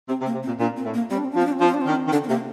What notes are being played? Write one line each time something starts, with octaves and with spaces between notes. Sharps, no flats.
C3 C4
C3
A#3
C3
C4
A#2
A#2 D4
C4
A2
A#3
G3 C4
D4
C4
D4
F3
C4
D4
C4
F3 D4
C4
D4
C4
D#3 D4
C4
D#3
D3 D4
C4
C3 A#3